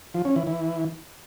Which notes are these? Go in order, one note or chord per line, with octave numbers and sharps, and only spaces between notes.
F3
C#4
E3
E3